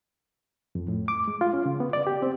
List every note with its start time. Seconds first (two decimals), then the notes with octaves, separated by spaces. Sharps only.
0.75 F2
0.88 A2
1.08 D6
1.28 G#3
1.41 F4
1.53 C#4
1.66 C#3
1.80 B3
1.93 D5
2.07 G4
2.22 C4